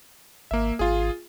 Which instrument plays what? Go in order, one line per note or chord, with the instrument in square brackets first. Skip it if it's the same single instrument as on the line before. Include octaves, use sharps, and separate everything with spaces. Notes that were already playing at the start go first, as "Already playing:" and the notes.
[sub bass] G#1 [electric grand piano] A#3 E5
[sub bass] G#1 [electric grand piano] F4 G#4